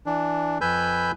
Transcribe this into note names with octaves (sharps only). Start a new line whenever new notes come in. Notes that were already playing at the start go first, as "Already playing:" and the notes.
E3 D4
F2 B4 G#5 B5 E6 G6